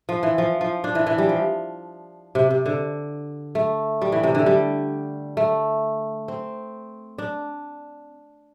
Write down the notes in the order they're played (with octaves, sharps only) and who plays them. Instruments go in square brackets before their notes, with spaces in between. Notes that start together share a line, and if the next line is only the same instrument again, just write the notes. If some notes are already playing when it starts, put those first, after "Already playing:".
[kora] F3
E3
F3
F3
D4
E3
E3
G3
F3
C3
C3
D3
A3
G3
E3
C3
D3
G3
A3
C4
D4